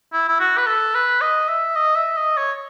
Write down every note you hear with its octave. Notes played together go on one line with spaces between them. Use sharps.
E4
E4
F#4
B4
A4
B4
D#5
E5
D#5
E5
D#5
C#5